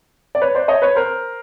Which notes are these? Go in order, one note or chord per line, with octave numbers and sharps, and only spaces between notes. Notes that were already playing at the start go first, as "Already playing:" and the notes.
D5
B4 C#5
C5 D5
C#5 D#5
B4 C#5
A#4 C5